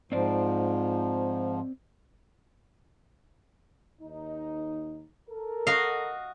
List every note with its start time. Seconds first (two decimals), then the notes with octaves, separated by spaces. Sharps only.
0.12 G#2 F3 C4 D5
4.01 D#2 D#4
5.29 A4 A#4
5.67 F#4 D#5 F5